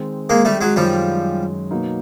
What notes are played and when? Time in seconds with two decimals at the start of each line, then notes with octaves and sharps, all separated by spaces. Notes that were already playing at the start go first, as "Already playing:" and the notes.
Already playing: D#3 G#3 C4
0.30 G#3 A#3
0.45 G3 A3
0.61 F#3 G#3
0.76 F#2 D#3 F3 G3 G#3 C#4
1.71 B2 F#3 A#3 D#4